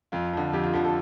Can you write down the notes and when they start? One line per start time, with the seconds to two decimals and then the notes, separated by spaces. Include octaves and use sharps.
0.12 F2 F4
0.33 D3 F3
0.53 F2 G4
0.64 F4
0.74 D3 F3 G4
0.85 A4